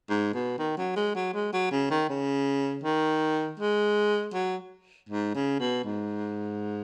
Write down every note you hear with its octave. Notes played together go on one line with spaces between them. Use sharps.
G#2
B2
D#3
F#3
G#3
F#3
G#3
F#3
C#3
D#3
C#3
D#3
G#3
F#3
G#2
C#3
B2
G#2